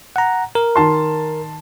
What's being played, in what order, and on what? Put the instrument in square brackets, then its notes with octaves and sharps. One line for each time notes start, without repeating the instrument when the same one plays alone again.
[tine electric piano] F#5 A#5
A#4
[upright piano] D#3 A5 C6